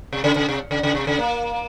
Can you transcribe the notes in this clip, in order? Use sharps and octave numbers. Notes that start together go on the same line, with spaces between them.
C3
C#3
C#3
C3
C#3
C#3
C3
C#3
A#3